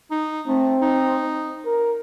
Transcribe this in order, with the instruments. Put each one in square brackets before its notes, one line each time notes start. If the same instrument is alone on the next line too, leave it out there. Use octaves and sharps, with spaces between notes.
[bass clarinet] D#4
[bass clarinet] A3 [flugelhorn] C4
[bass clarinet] D#4
[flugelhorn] A#4